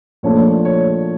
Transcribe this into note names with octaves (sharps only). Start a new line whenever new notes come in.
A#2 F3 A3 D4 C#5
C#5